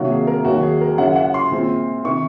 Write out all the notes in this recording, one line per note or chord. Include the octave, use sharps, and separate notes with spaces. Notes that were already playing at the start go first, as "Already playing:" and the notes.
Already playing: C2 C3 D#3 F#3 A#3 F#4
G#4
A#4
D#2 D#3 F#3 F#4
G#4
A#4
F#2 C#3 F#3 C#4 F#5
F#5
C6
A#2 G#3 C4
C3 D#3 C#6